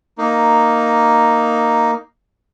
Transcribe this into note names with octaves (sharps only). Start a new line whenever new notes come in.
A#3 D#4